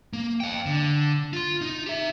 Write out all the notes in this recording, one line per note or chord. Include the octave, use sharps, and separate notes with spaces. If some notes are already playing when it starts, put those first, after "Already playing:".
A#3
F5 G5
D3
F4 C6
D#4
G4 E5